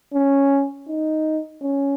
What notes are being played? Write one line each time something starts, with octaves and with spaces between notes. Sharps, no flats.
C#4
D#4
C#4